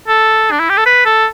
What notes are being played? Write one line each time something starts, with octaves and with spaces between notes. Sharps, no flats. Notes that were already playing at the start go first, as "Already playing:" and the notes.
A4
D4
E4
G4
A4
B4
A4